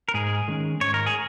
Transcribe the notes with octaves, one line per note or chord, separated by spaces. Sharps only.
A#4
G#2 G#4
D#3 G#3 C#4
G#2 C#5
A#4
G#4